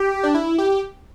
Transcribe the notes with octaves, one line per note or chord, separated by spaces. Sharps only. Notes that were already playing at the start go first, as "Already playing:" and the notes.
Already playing: G4
D4
E4
G4